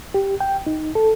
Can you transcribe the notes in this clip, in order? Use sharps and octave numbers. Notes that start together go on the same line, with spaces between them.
G4
G5
D#4
A4